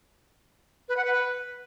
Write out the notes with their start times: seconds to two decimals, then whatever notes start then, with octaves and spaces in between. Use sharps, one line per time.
0.89 B4
0.97 F#5
1.05 B4